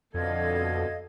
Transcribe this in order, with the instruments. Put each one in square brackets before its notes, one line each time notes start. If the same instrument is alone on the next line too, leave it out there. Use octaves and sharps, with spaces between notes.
[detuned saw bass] F2 [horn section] B2 D3 [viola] A4 [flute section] D#5 F5 G#6